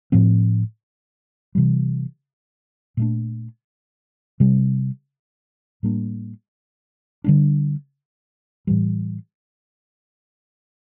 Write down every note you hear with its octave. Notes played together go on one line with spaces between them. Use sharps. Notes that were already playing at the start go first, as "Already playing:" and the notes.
A2 F3 C4
C3 E3 G3
A#2 A3 D4
C3 G3 C4
A2 G3 A#3 D4
D3 G3 A#3 D4
A2 E3 G3